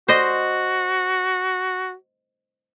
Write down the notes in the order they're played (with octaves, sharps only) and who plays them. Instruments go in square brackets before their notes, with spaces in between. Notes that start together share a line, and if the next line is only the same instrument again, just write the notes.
[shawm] F#4 [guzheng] C5 D#5